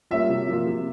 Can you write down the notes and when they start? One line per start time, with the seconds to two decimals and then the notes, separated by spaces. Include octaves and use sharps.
0.11 G3 A#3 C#4 F4 E5
0.29 C3
0.48 F3 A#3 F4
0.67 C3